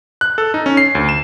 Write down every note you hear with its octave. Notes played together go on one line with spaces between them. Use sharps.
F#6
A4
D#4
C#4
C7
D2
E7